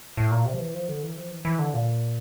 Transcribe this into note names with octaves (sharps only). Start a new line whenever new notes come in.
A2
A#2
C3
F3
E3
F3
D3
E3
F3
E3
E3
D3
A#2